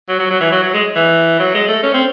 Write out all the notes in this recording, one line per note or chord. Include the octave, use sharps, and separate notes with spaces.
F#3
F#3
F#3
E3
F#3
F#3
G#3
E3
F#3
G#3
A3
C#4
C4